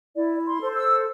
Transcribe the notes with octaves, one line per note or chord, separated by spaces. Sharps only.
E4 D5
C6
A4 C5
E6